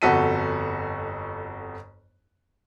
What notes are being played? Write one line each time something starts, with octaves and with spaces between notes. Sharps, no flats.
G1 F2 F#4 A4 B6 D#7